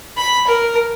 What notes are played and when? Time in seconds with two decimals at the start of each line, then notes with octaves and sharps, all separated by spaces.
0.17 B5
0.47 A#4